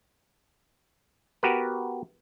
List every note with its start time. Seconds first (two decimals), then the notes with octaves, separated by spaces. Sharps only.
1.43 B3 F#4 G4 A#4 B4